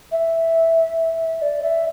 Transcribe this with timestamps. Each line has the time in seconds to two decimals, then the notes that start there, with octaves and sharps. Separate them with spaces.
0.12 E5
1.42 D5
1.62 E5